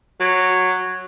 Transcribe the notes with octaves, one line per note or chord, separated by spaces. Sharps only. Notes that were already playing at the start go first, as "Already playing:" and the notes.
F#3